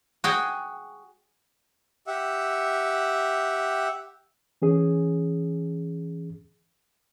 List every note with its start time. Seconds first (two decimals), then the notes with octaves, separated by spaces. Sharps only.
0.24 F#4 G#4 G5
2.07 G4 E5 F#5
4.62 E3 C#4 G#4